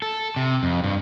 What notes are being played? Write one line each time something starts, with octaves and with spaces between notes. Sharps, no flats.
A4
C3
F2
G2